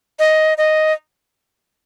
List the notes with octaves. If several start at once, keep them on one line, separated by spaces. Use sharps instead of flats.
D#5
D#5